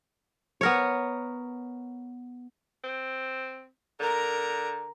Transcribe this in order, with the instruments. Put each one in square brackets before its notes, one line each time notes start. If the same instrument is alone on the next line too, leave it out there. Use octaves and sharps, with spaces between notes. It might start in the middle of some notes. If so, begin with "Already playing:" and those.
[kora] B3 A#4 C#5
[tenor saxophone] C4
[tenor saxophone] D3 [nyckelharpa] A#4 A#5